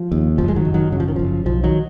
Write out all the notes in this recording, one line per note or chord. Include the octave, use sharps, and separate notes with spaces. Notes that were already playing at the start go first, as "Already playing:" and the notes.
Already playing: F3
D#2
F#1 F3
G#3
D#3 F#3
F#1
D#3 F#3
C#3 F#3
F3
D#3
F#1 F3
B1 F3
D#3 F#3